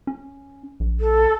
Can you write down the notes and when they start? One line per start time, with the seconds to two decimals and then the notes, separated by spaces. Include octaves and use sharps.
0.07 C#4
0.80 A#1
1.00 A4